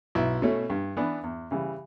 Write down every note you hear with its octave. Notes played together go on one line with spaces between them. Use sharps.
B1 E4
B2 A3 C#4
G2
E3 B3 D4
E2
C#3 E3 G3